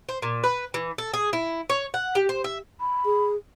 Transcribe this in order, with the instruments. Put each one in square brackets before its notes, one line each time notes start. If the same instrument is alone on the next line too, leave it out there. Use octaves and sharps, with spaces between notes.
[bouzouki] C5
A#2
B4
E3
A4
G#4
E4
C#5
F#5
G4
C5
E5
[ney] B5
[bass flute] G#4